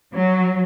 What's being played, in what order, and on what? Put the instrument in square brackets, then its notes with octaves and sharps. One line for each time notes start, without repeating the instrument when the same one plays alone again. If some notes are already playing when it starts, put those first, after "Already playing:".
[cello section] F#3